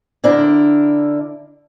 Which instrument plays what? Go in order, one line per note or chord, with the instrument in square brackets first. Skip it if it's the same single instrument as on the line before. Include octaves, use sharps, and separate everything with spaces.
[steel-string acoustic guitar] D3 D4 E4 A#4